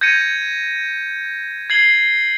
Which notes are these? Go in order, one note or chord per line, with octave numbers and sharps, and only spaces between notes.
G6 G#6 A#6 C#7 D#7
G#6 C7 F#7 G7